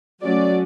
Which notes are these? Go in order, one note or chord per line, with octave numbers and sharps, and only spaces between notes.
F#3 A3 C#4 D5